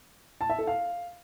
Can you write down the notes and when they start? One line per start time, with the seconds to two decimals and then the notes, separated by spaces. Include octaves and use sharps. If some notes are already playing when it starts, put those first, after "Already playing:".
0.41 A5
0.50 E5
0.58 A4
0.67 F5